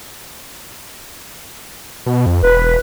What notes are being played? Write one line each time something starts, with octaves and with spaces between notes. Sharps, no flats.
B2
F2
E1 B4